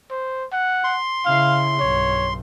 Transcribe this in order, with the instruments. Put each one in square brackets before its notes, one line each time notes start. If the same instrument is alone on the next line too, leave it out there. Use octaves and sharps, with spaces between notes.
[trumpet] C5
F#5
[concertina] C6
[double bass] C#3 E4 [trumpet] F5
[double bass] B1 G2 [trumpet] C#5